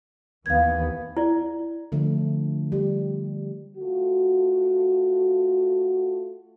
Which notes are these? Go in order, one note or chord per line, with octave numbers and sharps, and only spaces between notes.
D#2 E3 B3 F5 G#6
E4 D5
D3 F3 A3
G3
A3 F4 F#4